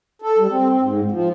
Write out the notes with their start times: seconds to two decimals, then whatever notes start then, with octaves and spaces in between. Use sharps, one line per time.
0.22 A4
0.39 G3
0.51 C4
0.70 C4
0.83 G#2
1.11 F3